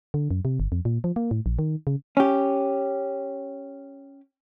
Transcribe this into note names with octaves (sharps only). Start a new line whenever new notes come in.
D3
F#2
C3
G1
F2
A#2
F3
A#3
A2
A#1
D#3
C#3
C#4 G4